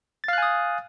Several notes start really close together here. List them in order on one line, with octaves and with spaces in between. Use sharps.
A6 F5 F#6 G#5 D#6